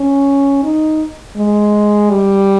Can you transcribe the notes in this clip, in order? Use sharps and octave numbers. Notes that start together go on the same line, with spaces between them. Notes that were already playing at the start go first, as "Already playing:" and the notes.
Already playing: C#4
D#4
G#3
G3